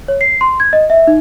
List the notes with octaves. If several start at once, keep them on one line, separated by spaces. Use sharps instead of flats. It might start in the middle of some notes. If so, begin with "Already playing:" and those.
C#5
C7
C6
G#6
D#5
E5
D#4